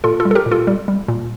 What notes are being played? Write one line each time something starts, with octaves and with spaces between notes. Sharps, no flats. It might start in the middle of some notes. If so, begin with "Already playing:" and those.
A#2 F4 A4
F4 A4
G3
A4
G4 A#4
A#2
F4 A4
G3
G3
A#2